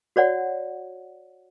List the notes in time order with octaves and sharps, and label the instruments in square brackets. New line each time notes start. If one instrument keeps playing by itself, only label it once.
[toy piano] F#4 C#5 D5 F#5